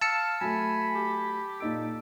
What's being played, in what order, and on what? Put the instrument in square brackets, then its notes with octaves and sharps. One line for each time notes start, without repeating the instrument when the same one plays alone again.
[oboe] F5 [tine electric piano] A5 E6 C#7
[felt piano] F#3 A3 [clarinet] G#5 [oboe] B5
[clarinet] G4
[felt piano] A#2 D#4 D7 [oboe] A4